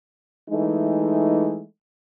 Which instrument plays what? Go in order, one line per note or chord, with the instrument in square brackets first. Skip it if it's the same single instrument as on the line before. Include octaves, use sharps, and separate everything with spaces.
[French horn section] E3 G#3 A3 D#4